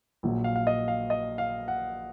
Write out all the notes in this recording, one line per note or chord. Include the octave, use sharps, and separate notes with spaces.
A#1 A#2 F#3
F5
F5
D#5
F5
D#5
F5
F#5